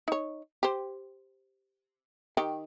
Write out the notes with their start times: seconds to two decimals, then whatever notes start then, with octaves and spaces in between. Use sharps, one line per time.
0.08 D#4 C#5
0.63 G4 C5
2.37 D#3 G4